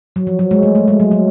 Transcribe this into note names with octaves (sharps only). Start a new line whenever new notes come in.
F#3
F3
F#3
G#3
A3
A3
G#3
F#3
F#3